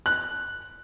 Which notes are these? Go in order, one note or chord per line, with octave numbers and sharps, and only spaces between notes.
F#6